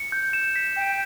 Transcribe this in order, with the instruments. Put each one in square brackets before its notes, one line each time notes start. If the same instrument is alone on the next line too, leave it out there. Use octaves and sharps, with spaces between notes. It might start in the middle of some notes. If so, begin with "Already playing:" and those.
Already playing: [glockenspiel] C#7
G6
E7
B6
[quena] G5 [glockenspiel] G6